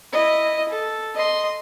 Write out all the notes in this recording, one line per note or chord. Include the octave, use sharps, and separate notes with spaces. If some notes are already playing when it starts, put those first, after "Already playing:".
E4 D#5
A4
D#5 C6